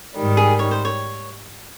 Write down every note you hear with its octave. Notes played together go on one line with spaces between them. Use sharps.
G#2 D#3 G3
G#4
C#5
C5
C#5